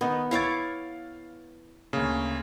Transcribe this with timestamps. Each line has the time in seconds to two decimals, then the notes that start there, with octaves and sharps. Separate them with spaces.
0.01 D#3 B3 D#4
0.31 E4 C#5 F5 D6 A6
1.93 D2 C#3 A#3